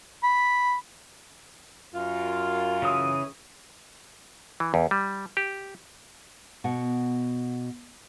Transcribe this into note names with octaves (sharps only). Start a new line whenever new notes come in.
B5
F#2 F4
C#3 E3 D#6
E3
E2
G3
G4
B2 F#5